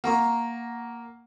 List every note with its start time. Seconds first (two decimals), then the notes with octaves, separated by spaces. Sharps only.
0.04 A#3 F#5 A#5 C#6